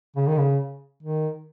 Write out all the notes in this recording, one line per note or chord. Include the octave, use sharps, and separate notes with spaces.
C#3
D#3
C#3
D#3